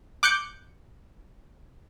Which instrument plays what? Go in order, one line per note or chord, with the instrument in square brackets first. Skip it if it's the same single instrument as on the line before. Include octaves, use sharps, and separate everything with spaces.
[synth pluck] D6 F#6 G6 C#7